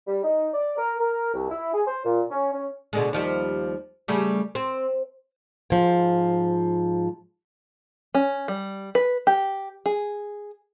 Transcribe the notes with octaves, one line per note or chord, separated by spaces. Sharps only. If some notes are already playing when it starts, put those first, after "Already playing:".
G3
D#4
D5
A#4
A#4
C2
E4
G#4
C5
A#2
C#4
C#4
B2 D3 G#3
D#2 F3 G3
C#3 G3 A3
C4
G#2 F3
C#4
G3
B4
G4
G#4